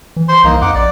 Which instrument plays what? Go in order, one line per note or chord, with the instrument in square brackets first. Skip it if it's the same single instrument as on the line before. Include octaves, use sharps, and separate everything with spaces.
[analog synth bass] E3
[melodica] C5 C6
[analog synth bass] C2 [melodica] A#3 D#4
[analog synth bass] F2 [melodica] D#4 F#5 D6
[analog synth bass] A#1 [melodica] D5